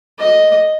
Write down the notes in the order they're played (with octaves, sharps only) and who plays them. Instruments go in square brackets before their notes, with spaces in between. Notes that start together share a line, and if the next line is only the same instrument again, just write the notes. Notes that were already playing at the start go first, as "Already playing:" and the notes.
[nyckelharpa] D#5